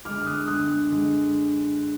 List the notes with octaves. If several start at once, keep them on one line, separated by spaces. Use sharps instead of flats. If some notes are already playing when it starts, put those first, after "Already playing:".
D3 G#3 D6 F6
F6
D#6 F#6
D3 G#3 D#6 F#6
D3 G#3